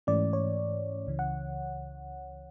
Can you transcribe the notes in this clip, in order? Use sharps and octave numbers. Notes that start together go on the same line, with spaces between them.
G#2 E3 A3 C#4 D5
C#5
C#2 C#3 E3
F#5